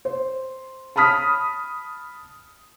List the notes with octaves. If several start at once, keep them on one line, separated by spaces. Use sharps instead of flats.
C5
A5 B5 D#6 F6 B6